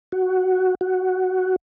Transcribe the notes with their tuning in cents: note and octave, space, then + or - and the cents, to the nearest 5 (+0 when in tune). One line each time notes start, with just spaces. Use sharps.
F#4 +5
F#4 +5